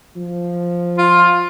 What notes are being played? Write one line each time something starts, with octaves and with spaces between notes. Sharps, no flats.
F3
F4